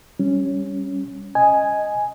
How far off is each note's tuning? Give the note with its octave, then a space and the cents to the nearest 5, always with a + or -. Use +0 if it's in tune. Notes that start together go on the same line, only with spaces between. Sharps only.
G3 +0 C#4 +0
D#5 +0 G#5 +0